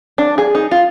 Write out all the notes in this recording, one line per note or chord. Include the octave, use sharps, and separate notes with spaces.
D4
G#4
D#4
F4